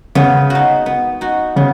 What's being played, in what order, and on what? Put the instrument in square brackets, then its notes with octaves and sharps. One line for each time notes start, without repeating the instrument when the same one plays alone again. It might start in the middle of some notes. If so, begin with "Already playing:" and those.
[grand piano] C#3 [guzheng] B3
[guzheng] D#4 F#4
B3
D#4 F#4
[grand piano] C#3 [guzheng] B3